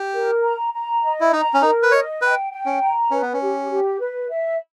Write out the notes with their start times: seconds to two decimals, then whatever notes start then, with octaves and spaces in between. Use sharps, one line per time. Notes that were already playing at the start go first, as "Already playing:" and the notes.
Already playing: G4
0.14 A#4
0.43 A#5
0.73 A#5
1.03 D#5
1.20 E4
1.32 D#4 A#5
1.54 C#4
1.62 D#4 A#4
1.83 B4
1.91 C#5 D#5
2.22 B4 G5
2.52 G5
2.66 C#4
2.81 A#5
3.11 C#4 B4
3.22 B3
3.33 C#4
3.41 G4
3.70 G4
4.00 B4
4.30 E5